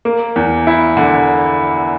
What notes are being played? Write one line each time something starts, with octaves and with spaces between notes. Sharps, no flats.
A#3
E2
E4
D3